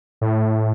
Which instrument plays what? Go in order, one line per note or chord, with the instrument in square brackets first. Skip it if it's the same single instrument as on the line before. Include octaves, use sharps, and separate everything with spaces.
[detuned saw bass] A2